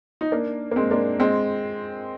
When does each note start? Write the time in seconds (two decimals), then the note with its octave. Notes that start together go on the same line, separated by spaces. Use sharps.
0.21 D#4
0.32 A#3 D4
0.71 A#3
0.76 G#3 C4
0.91 A#3 D4
1.20 G#3 C4